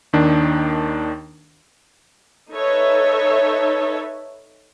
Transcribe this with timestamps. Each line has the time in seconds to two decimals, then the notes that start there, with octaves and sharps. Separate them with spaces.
0.13 D#2 D#3 D4
2.52 D#4 A4 B4 C#5 E5